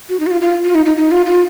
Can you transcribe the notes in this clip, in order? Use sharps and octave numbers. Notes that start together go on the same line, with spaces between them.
F#4
D#4
F#4
F4
F4
F4
D#4
D#4
D#4
F4
F4